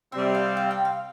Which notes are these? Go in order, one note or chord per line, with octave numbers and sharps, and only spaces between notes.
C3 G3 C4 E5
F5
F5
G5
F5